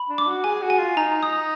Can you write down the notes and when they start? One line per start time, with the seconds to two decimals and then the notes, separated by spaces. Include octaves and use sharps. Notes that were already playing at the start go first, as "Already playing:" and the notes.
Already playing: B5
0.09 D4
0.18 D6
0.27 F#4
0.44 G#4 G#5
0.62 F#4
0.70 G#5
0.79 F4
0.96 D#4 A#5
1.23 D#6